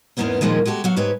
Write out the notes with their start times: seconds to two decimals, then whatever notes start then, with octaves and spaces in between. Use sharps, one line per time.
0.17 E2 G#2 E3 A#3 B3 C#4
0.41 A#2 D#3 F3 G#3 A#3
0.65 G#3 F#4 G4 A4
0.84 F#3 F#4 F5
0.96 G#2 G4 B4 C#5 G5